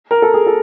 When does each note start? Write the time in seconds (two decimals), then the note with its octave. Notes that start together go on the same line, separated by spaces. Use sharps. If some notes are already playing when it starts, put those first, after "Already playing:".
0.11 A#4
0.22 A4
0.34 G#4
0.47 A4